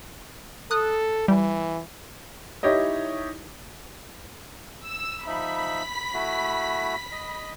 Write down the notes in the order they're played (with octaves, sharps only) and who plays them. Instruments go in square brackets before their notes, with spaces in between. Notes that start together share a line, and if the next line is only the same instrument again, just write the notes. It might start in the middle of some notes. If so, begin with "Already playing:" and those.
[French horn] A4 [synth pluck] D#6 F#6
[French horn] E3 [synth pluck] G3
[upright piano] D#4 E4 G4 C#5 D#5
[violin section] E6
[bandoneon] F3 D#4 E5 [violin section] B5 B6
[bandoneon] A3 E4 F#4
D#5